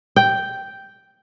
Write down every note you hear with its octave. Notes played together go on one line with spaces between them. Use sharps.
G5